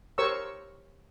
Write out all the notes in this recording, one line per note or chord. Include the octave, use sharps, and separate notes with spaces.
G4 A#4 C5 C#5 C#6 E6